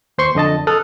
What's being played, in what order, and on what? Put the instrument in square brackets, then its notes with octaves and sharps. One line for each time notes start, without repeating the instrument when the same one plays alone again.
[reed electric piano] D#2 C5 C6 C#6
F2 D3 D#5 A5
A4 D#6 F6 F#6